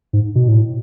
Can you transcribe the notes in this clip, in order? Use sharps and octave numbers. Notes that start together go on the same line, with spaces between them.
G#2
B2
A2